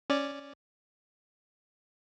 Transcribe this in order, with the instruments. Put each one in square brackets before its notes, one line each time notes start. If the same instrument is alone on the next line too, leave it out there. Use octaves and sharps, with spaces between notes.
[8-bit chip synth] C#4 D5